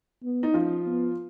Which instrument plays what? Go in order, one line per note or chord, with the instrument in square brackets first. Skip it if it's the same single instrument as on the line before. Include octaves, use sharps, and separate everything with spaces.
[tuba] B3
[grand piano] D#4
[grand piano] F3 F4 [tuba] C#4
[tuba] B3